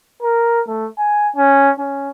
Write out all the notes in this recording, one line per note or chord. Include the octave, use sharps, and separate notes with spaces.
A#4
A3
G#5
C#4
C#4